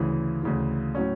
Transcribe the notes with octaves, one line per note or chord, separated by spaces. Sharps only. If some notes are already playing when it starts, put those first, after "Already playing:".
Already playing: D2 C#3 E3
D2 C#3 E3
A2 F#3 C#4